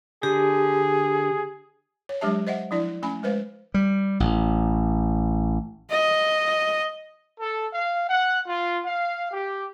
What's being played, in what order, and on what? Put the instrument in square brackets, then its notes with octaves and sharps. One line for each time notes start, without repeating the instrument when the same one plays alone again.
[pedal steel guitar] D3 [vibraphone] G4 [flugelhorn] G#4
[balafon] C#5
F#3 G#3 D4 G4 E5 A5
C5 D#5 E5 F#5
F3 D4 E4 D5
A3 C#4 G#5 B5
G#3 B4 C5 F5
[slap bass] G3
A1
[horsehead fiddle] D#5
[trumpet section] A4
F5
F#5
F4
F5
G4